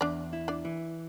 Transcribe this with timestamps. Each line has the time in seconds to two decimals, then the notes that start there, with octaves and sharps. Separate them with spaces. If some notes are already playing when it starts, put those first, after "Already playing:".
0.01 E2 D4 D5
0.33 E4
0.48 D4 D5
0.65 E3